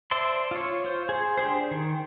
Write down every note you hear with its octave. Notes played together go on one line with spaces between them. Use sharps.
C5 D5 E5 A5 C6
F4 C#5
F4 C5
G#4 C5
D4 G4 G#4 C5
D#3